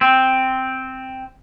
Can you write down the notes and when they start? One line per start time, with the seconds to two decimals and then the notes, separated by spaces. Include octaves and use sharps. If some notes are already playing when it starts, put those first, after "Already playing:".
0.01 C4